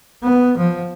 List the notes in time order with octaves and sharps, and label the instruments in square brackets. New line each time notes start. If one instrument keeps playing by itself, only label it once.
[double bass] B3
F3